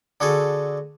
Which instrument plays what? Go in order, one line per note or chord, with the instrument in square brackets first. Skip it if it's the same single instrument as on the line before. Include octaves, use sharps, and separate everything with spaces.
[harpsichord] D3 F#4 G#4 A4